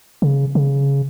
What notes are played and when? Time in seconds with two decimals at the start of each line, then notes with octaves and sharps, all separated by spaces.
0.22 C#3
0.55 C#3